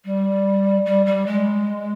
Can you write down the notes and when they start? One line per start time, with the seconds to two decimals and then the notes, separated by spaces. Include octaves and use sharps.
0.05 G3
0.86 G3
1.06 G3
1.27 G#3